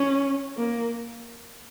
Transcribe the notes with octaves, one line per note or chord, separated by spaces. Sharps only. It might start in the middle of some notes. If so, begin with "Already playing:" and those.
Already playing: C#4
A#3